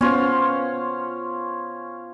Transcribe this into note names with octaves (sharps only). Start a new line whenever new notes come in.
B3 C#4 F4 C5